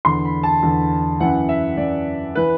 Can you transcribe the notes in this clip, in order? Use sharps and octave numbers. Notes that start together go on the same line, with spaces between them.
E2 D3 C6
B5
A5
E2 D3
F#2 E3 F#5
E5
F#2 E3 D5
E3 B4